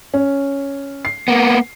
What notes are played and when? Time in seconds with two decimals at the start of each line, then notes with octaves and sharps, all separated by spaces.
0.14 C#4
1.05 C7
1.28 A#3 B3